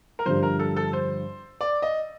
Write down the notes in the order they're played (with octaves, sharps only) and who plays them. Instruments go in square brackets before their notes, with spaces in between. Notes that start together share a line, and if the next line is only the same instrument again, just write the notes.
[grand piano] A#4
[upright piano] G2 D3 F3 [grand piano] C5
[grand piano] A#4
A4
A4
C5
D5
D#5